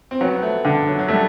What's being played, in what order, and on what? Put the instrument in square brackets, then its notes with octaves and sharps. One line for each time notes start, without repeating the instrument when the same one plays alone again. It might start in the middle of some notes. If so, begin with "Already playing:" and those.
[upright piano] C4
[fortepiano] F#3 [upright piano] B3
[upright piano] A3
[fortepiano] D3
[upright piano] F#3
F#3
[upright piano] G3 [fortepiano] A3